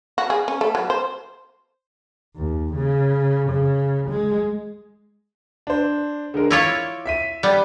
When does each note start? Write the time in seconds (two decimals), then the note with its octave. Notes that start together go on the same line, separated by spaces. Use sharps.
0.18 F#4
0.30 G#4
0.48 C#4
0.61 A3
0.75 F#3
0.90 C5
2.36 D#2
2.75 C#3
3.50 C#3
4.10 G#3
5.67 D4 C5
6.34 D3 G#3 A#4
6.51 E4 F4 C#5 D6 A#6
7.06 E5 B6 D#7
7.43 G3 B3